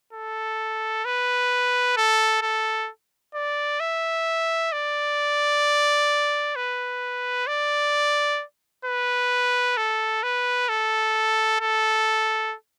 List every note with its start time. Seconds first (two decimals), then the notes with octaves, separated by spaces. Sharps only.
0.13 A4
1.05 B4
1.97 A4
2.42 A4
3.34 D5
3.80 E5
4.72 D5
6.56 B4
7.47 D5
8.85 B4
9.77 A4
10.23 B4
10.69 A4
11.60 A4